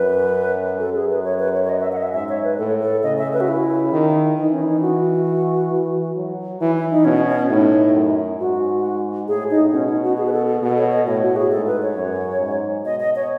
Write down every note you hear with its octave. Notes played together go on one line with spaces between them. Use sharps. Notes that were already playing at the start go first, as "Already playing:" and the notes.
Already playing: F#2 B4
F#2 A4
G#4
B4
C#5
B4
C#5
C#5
D#5
E5
F#5
D#5
E5
G#2 E5
C#5
B4
A2 A4
A4
C#3 D#5
E5
B4
F#4
E4
D#3
E3 D#4
C#4
E4
D#4
F#4
E3
F#3
E3 E4
E4
D#4
B2 C#4
C#4
A2 D#4
F#2
G#2 F#4
A2 G#4
D#4
B2 C#4
D#4
F#4
G#4
B4
A4
A4
B2 A4
C#5
D#5
A2 C#5
F#4
G#4
G#2 A4
B4
C#5
F#2
G#2
B2 D#5
D#5
C#5